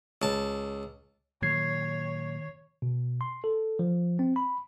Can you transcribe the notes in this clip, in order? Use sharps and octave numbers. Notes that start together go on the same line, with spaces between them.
C#2 A5
A#2 D#3 F#3 C#5 G#6 C7
B2
C6
A4
F3
C4
B5